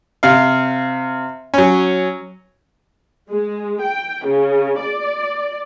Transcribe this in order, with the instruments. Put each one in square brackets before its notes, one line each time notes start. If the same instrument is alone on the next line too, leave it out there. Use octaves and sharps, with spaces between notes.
[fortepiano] C3 F5
F#3 C#4
[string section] G#3
G5
C#3
D5